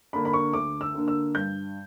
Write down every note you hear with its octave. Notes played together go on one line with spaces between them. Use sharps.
D3 A#3 D4 B5
B5
C#6
D2 D6
E6
D3 A#3 D4
E6
G2 G6